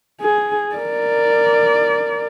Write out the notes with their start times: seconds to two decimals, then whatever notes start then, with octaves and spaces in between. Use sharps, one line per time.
0.21 G#4
0.76 A#4 D5